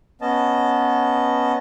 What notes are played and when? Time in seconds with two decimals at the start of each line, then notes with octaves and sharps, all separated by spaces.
0.21 B3 C#4 D#5 A5